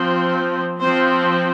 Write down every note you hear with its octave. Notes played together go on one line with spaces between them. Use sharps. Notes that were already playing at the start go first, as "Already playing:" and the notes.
Already playing: F3 C4
F3 C4 C5